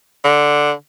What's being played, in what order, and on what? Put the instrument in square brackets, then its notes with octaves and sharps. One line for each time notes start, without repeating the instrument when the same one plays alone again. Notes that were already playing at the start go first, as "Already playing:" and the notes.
[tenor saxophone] D3